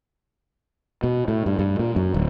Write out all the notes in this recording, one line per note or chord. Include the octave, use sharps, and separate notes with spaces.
B2
A2
G2
G2
A#2
F#2
D1